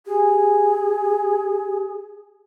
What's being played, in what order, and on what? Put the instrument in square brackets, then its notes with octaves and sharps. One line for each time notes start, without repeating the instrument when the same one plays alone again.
[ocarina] G4 [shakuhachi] G#4